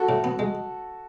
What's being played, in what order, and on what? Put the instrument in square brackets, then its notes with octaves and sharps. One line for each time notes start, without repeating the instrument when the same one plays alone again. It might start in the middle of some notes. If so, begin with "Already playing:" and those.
Already playing: [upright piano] F#4 A4
[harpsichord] A2
B3
G#3